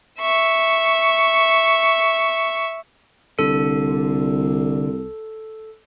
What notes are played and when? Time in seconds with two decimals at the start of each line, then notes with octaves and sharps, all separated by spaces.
0.21 E5 C#6
3.39 C2 D3 A4